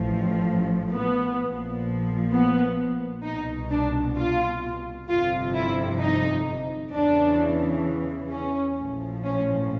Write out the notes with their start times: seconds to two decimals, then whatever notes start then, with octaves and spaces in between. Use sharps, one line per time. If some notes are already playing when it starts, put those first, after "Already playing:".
Already playing: A1 A2 F3
0.94 B3
1.39 A#1 A#2 F3
2.32 B3
3.25 C2 B2 D#4
3.70 D4
4.17 F4
5.09 G1 F2 C3 F4
5.55 E4
6.01 D#4
6.94 E2 C#3 E3 D4
8.31 C#4
8.78 A#1 A2 F3
9.25 C#4